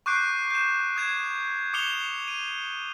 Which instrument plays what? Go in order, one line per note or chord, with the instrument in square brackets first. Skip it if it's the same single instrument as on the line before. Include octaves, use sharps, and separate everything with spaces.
[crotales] C#6 D6 F#6 G6 C7 D7
G6 E7
D#6 G#6 E7
D6 D#6 C#7 E7 F7 G7
D#7